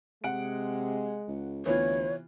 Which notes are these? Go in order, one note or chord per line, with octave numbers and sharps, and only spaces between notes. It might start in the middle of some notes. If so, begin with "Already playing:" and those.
C3 G#3 F#5 D7
C#2
D2 C3 E3 B3 F4 C#5